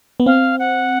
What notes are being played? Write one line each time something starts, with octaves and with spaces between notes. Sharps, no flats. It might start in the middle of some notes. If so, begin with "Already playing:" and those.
B3
C4 F5
F#5